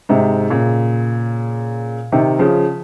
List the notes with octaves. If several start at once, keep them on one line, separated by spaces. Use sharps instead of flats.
G#2 C3
A#2 C#3
C3 D#3
C#3 F3